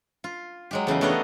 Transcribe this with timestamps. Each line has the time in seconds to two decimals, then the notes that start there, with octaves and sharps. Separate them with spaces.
0.24 F4
0.71 F#3 G#3 G4
0.87 E2 C#3 A3 F5
1.01 A3 B3 D4 A#4 C#5 D#5